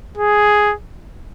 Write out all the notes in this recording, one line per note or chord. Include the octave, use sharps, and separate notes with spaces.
G#4